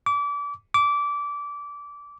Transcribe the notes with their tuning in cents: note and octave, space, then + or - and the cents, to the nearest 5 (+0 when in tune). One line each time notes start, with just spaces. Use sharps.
D6 -30
D6 -20